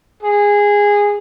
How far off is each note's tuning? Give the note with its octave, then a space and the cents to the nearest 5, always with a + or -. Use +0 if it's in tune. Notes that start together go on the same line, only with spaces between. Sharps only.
G#4 -15